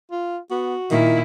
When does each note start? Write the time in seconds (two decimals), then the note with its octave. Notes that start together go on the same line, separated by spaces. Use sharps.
0.12 F4
0.51 B3 F#4
0.91 A#2 D#3 E4